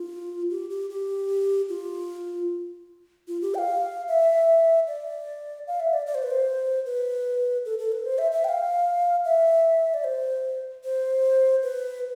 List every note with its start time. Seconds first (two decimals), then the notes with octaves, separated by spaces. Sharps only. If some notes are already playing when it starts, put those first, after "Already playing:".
Already playing: F4
0.50 G4
0.70 G4
0.90 G4
1.69 F4
3.28 F4
3.42 G4
3.54 G5
3.58 F5
4.08 E5
4.87 D5
5.67 F5
5.80 E5
5.93 D5
6.06 D5
6.14 C5
6.22 B4
6.30 C5
6.86 B4
7.65 A4
7.79 A4
7.92 B4
8.05 C5
8.18 E5
8.32 E5
8.44 G5
8.49 F5
9.25 E5
9.94 D5
10.04 C5
10.84 C5
11.63 B4